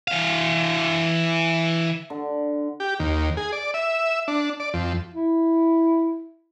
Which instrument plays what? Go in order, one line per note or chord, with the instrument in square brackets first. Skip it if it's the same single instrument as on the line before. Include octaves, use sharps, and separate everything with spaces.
[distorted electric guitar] E3 F5
[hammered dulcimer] D3
[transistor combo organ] G4
D#2
G#4
D5
E5
D4
D5
F2
[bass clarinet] E4